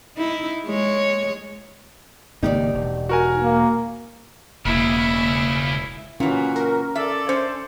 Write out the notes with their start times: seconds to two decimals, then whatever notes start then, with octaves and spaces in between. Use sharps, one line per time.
0.17 D#4 E4
0.65 G#3 C#5
2.43 G#1 C#3 A#3 D#4 G4 D5
2.74 E1
3.09 F#4 A#4 G#5
3.43 A#3
4.65 E1 C#2 C#3 A#3 E4
6.20 A#2 E3 C#4 F#4
6.56 A#4
6.96 A4 D5 E5
7.29 C#4 C5